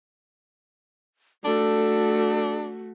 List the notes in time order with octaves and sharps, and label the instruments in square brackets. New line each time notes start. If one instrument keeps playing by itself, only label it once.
[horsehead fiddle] A3 F#4 [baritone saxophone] D4 [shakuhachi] A4